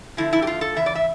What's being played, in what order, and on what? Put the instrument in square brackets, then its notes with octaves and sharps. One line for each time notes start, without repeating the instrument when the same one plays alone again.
[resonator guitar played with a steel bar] D3 F3 A3 E4
E4
G4
F4
A4
C#3 E3 E5
D5
E5